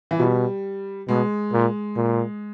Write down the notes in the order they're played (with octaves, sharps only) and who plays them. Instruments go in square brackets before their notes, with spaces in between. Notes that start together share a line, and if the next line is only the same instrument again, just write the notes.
[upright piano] E3
[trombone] B2 [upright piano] G3
[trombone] B2 [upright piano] G#3
[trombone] A#2
A#2